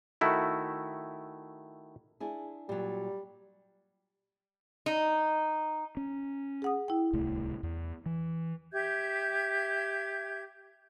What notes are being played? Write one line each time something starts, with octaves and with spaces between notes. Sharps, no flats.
D#3 A3 E4 F#4
D4 E4 G#4
A#2 F#3 G3
D#4
C#4
G#4 F#5 D#6
E4 G5
D1 C2 A3
E2
E3
G4 E5 G6 G#6